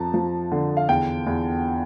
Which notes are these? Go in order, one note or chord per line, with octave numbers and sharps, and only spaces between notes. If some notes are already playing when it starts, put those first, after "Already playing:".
Already playing: F2 F3 A5 A#5
F3
D3
F5
E2 G5
E2